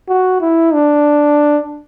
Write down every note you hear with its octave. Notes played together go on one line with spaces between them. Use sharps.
F#4
E4
D4